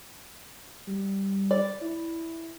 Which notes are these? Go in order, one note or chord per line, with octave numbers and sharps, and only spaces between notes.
G3
D5
E4